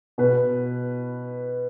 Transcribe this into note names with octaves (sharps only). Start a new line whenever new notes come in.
B2 B4